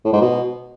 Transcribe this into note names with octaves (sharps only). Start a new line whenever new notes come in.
A2
G#2
B2